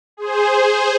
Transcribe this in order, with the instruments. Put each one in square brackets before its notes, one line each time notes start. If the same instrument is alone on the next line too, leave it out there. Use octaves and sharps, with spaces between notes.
[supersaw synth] G#4 C5